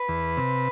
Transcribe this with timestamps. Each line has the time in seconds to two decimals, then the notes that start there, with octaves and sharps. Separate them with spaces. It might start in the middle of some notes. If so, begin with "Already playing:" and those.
Already playing: B4
0.09 E2
0.37 C3